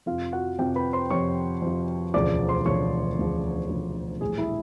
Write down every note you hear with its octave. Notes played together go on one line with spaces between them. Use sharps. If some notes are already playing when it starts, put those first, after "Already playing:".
F2 C3 F3 F4 F5
F#4 F#5
F2 C3 F3 G4 G5
B4 B5
C5 C6
F2 C3 F3 C#5 C#6
F2 C3 F3
E1 D2 C#3 F3 D5 D6
C5 C6
E1 D2 C#3 F3 C#5 C#6
E1 D2 C#3 F3
E1 D2 C#3 F3
A#1 A2 E3 G3 G#4 G#5
E4 E5